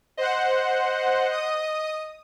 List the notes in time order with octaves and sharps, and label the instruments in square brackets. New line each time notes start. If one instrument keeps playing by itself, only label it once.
[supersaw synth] C5 F#5 [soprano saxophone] D#5
[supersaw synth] D#6